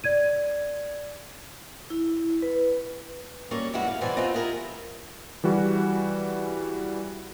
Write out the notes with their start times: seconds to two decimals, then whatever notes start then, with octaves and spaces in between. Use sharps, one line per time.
0.04 D5 G#6 D#7
1.90 E4
2.42 B4
3.51 F#3 G3 A#3 C#4 C#5
3.73 E2 E3 G3 G#3 F#4 B4
3.88 F5
4.01 B2 E3 G3 B4 C5 G#5
4.17 C4 D#4 F4 F#4 B4
4.34 E4 F4 G4 G#4 A#4 B4
5.44 E3 G3 F#4 G#4